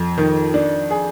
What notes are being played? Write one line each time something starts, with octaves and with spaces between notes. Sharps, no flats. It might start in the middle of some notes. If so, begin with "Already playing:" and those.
Already playing: F2
D#3
D4
G#4